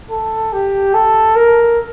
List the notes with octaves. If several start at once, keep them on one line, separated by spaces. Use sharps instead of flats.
A4
G4
A4
A#4